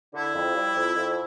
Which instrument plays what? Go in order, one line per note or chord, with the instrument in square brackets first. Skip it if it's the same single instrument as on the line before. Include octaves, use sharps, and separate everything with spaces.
[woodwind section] D3 [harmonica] E4
[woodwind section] F2
G3
F2
F2